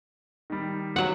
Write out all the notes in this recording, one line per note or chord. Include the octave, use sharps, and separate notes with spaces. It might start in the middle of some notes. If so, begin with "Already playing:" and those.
D#3 G3
F#3 F#5